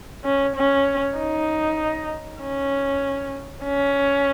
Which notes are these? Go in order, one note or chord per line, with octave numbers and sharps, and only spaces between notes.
C#4
C#4
D#4
C#4
C#4